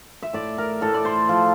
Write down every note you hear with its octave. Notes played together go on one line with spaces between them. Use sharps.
E5
A2 D5
A#4
A2 A4
D5
C5
F3